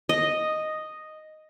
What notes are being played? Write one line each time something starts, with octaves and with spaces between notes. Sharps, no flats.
D#5